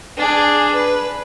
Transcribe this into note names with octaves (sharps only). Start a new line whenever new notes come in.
D4 G#4
B4